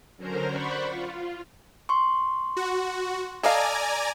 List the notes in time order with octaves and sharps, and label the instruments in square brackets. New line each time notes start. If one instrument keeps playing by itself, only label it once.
[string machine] D3 F#3 C#4 A#4 C5 A#5
C5 D5 F#5 B5 C#6
F4
[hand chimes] C6 C#6
[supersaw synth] F#4
[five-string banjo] A4 D#5 F5 [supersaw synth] D5 G#5 A#5